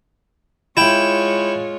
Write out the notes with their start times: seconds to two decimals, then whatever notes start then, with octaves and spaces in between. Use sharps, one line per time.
0.77 G#3 E4 F4 C#5 G5